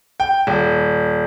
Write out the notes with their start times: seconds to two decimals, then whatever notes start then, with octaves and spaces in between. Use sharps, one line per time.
0.20 G5
0.47 D#1